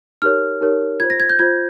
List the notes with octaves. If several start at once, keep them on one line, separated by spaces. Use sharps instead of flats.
D#4 G4 A#4 C#5 F6
D#4 G4 A#4 C#5
F4 C5 G#6
A#6
G#6
G6
F4 C5 G#6